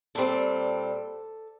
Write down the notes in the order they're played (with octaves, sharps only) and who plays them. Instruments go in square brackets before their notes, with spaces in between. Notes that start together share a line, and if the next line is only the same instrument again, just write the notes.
[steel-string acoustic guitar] A#2 G3 C4 A4